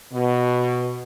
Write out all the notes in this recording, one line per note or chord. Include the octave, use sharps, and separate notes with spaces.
B2